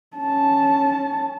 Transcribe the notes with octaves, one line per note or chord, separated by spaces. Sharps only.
C#4 A5